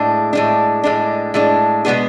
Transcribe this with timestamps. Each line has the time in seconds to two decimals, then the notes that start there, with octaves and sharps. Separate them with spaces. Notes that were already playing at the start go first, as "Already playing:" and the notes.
Already playing: A2 G#3 D4
0.33 A2 G#3 D4
0.84 A2 G#3 D4
1.34 A2 G#3 D4
1.85 B2 G#3 B3 D4 G#4